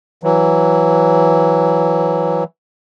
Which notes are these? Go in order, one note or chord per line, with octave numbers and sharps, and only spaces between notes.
E3 F#3